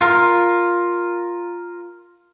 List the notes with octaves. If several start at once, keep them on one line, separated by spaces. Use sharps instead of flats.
F4 A#4